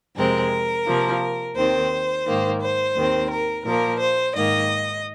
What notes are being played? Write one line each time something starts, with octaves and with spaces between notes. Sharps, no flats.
F2 C3 G#3 C4 A#4
C3 F3 A#3
D#2 D#3 C4 C5
G#2 D#3 A#3
C5
D#2 D#3 C4
A#4
A#2 F3 A#3 A#4
C5
G#2 D#3 A#3 D#5